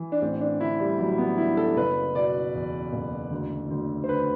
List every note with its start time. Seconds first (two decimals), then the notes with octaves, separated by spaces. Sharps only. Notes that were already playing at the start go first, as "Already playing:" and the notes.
Already playing: E3
0.12 D4
0.22 A1 C4
0.41 D4
0.60 D3 E4
0.80 G3
0.99 A1 F#3
1.18 B3
1.38 D3 E4
1.57 A4
1.77 F#1 B4
2.15 B2 D5
2.55 E2
2.93 F#1
3.31 D2
3.71 D2
4.04 C5
4.09 D3 B4